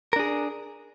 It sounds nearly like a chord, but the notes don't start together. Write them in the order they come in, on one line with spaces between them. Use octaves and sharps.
A#4 D4 G#4